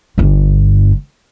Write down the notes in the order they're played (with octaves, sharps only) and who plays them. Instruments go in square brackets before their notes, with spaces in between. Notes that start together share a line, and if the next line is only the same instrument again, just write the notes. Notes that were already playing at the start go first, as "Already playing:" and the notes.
[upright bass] G1 G2